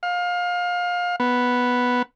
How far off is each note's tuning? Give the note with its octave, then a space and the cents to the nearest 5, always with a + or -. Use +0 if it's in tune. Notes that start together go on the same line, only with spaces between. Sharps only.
F5 +25
B3 +0